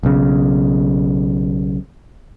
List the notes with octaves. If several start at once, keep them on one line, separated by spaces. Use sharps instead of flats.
B1 C#3